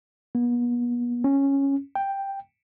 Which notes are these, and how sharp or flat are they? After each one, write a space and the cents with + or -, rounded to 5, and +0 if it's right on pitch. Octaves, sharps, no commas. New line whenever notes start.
B3 -40
C#4 -5
G5 +5